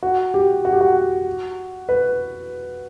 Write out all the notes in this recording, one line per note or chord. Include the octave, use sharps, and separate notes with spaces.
F#4
G4
F#4
G4
F#4
B4